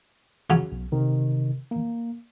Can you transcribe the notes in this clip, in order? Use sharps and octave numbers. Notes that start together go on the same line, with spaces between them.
C#3 F#3 C#4
B1
C3 D#3
A#3